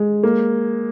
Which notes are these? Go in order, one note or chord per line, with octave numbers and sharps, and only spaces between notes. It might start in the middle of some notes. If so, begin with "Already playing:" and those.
Already playing: G#3
A#3